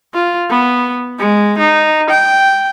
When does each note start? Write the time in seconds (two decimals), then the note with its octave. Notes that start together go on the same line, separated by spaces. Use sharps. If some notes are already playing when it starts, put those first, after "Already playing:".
0.14 F4
0.50 B3
1.19 G#3
1.58 D#4
2.10 G5